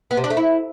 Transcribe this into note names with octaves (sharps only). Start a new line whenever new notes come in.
B3
C3
D4
A3
E4